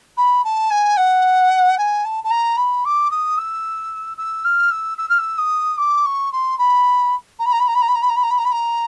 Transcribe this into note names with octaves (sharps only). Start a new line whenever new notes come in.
B5
A5
G#5
F#5
G#5
A5
A5
A#5
B5
D6
D#6
E6
E6
F6
E6
E6
F6
E6
D#6
D6
C#6
C6
B5
A#5
B5
A#5
B5
A#5
B5
A#5
B5
A#5
B5
A#5
B5
A#5
B5
A#5
B5
A#5